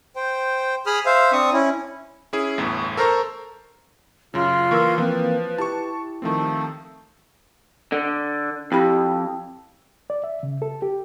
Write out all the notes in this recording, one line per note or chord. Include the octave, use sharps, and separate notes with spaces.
C5 G5
G#4 B5 D#6 F6
C5 E5 F5
C4 D4 C#6 D#6
C#4 E4
C#4 E4 G#4
G1 E2 A2
A4 A#4 C5 A#5 C#6
F#2 C#3 F4
E3 A#3 A#4 C#6 E6
E3 F3 A#3 C4 B4
E4 G4 A5 C#6
D#3 F3 A3 C4
D3
F2 E4 G4 B5
D5
E5
C#3
A4
G4